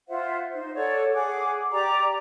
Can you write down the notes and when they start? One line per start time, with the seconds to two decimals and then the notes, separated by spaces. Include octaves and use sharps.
0.09 F4 C5 E5 F#5
0.53 D#4 C5
0.75 A4 C#5 D5 F#5
1.13 G#4 F#5 D6
1.72 G4 D5 A#5 D6